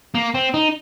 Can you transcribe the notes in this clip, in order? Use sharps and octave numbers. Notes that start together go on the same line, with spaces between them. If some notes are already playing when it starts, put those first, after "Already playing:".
A#3
C4
D#4